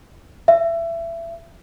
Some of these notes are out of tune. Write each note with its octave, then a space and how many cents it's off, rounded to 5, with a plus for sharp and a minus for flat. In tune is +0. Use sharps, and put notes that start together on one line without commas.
E5 +25